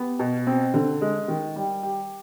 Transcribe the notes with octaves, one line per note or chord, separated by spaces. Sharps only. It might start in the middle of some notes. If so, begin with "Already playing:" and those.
Already playing: B3 G4
B2
C4
D3
G#3
D#3
G3
G4